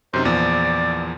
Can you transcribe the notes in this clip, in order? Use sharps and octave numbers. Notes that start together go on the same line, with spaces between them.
F#2 C3 D#4 C5
E2 A#2 F3 D5